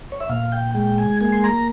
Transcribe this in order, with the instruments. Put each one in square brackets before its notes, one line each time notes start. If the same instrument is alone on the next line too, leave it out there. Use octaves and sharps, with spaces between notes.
[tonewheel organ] C#5
E5
A#2 F5
G5
G#3 G5
G#5
A#3 G#5
C6
A#5